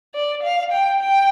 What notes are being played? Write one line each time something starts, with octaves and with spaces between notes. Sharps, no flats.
D5
F5
G5
G5